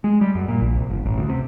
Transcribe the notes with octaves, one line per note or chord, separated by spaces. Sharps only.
G#3
G3
F#2
A#2
A#1
C2
G1
A1
D2
C3